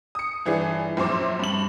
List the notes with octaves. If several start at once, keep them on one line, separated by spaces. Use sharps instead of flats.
D#6 C#7
G1 E3 D4 G#4
A#1 F#2 C5 D6
G2 F#7